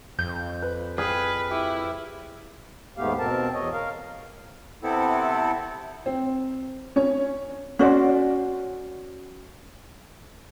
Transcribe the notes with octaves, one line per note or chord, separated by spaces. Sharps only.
F2 G6
B4
G#4 B4 F5 G5 B5
E4 G4
D#2 G#2 A3 B3 G4 F5
B2 C4 A#4 A5
E2 C#5 D#5
A#4 F5
C3 B3 C4 E4 A4
C4
C#4 C#5
C#4 F#4 C5 D5